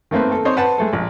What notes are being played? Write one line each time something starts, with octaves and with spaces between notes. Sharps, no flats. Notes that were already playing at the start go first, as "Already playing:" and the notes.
D#3 A3 A#3 C4 B4
A4
C4 D#4 C5 C#5 D#5
B4 C5 F#5 A5
G#3 A3 A4
A#1